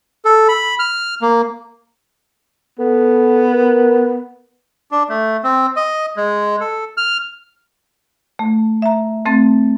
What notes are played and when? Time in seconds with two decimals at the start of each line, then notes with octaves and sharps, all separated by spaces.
0.25 A4
0.48 B5
0.79 F6
1.21 A#3
2.79 B3 A4
3.52 A#4
4.91 D4
5.09 A3
5.44 C4
5.76 D#5
6.16 G#3
6.61 A4
6.97 F6
8.39 A3
8.82 E5 A#5
9.26 A3 C4 A6